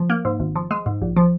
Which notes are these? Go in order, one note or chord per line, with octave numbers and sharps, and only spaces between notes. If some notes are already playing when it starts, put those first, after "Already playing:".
Already playing: F3
A#3
G#2
G#1
F3
G#3
G#2
A#1
F3